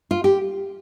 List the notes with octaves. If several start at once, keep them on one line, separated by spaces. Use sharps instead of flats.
F4
G4